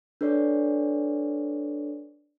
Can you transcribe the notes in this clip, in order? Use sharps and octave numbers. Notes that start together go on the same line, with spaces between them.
D4 A4 B4 C#5 D5